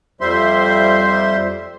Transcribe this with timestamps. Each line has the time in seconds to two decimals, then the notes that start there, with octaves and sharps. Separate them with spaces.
0.21 F2 G3 C5 E5 C6